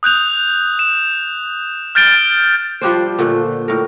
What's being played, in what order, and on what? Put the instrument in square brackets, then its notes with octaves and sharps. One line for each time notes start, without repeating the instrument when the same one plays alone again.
[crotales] D#6 F#6 G6 F7
E7
F6 G6 A6 D7 G7
[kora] F3 G3 D4 C5
A#2 D3 A3
A2 A#4